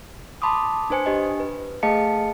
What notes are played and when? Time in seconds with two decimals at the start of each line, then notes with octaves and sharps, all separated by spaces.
0.42 A5 B5 C6 D6 D#6
0.90 D4 B4 C5 G#5 C#7
1.05 D4 G4 D#5 G#5
1.40 B4
1.83 A3 G#4 D#5 F5 A5 C#7